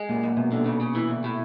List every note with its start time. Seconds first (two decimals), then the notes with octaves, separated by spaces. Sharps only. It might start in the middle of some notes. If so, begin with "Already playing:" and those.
Already playing: G#3
0.09 F#2 A#2
0.24 F#2
0.37 F#2 B2
0.52 D3
0.66 C#3
0.81 C#3
0.95 E3
1.09 D2
1.24 A2